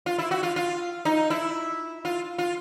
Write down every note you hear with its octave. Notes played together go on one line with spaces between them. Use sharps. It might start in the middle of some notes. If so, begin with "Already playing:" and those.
F4
E4
F#4
F4
F4
D#4
E4
F4
F4